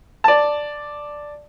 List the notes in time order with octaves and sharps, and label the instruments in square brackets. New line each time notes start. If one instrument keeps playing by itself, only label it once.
[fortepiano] D5 A5